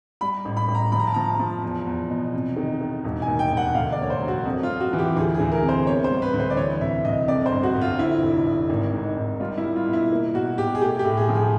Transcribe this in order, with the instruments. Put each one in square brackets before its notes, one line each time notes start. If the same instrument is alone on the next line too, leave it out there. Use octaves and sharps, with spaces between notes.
[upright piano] G3 B5
A1
B5
A1
A#5
F3 B5
A#5
A5
F3 A#5
F3
E2
E2
B2
C3
D#3
D#3
E1
G#5
D#2
G5
E1
F#5
D2 F5
D5
A#3 C#5
C5
F#3
F#4
F2
F4
F2
F#4
E3
G4
D2 G#4
G#4
D2
A#4
C3
C5
B3 C#5
C5
G3
B4
D2
C5
D5
E3 C#5
C2 E5
C2 D#5
F2 D5
C5
G1
F#4
G1
F4
D3 E4
F1
F1
G#1
G#2
G#1
G3 F4
E4
G3
F4
B2
E4
A#3
B2 F#4
B2 G4
G#4
A3 G4
G4
A2
G#4
F3
G#4